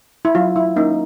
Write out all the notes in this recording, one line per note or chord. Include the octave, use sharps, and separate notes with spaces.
E4
F#3 F4
E4
A#3 C#4 D#4